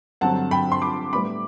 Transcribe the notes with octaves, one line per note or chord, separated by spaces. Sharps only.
G2 D3 F#3 C4 F#5 A5
G5 B5
C6
B5 D6
A2 G3 B3 D4 B5 D6